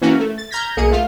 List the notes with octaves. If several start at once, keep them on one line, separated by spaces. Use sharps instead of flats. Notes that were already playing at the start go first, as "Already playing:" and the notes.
E3 A#3 C#4 F#4
A3
A6
A#5 F6 G6 G#6 A#6 B6
B1 A#3 G#4 C#7 D#7
A3 F4